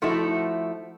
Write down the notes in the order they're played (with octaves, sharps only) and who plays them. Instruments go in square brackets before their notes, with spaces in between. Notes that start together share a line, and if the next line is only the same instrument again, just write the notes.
[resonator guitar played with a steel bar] F3 A3 D#4 E4 F#4 A4